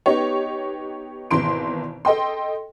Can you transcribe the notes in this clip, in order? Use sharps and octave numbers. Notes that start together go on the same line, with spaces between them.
B3 D#4 G4 C#5
G#1 B2 E3 C6 D7
A4 D#5 G5 C6